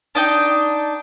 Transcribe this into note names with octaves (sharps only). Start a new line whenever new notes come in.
D4 D#4 G5